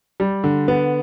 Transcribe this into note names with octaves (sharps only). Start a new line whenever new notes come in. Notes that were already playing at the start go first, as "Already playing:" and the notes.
G3
D3
B3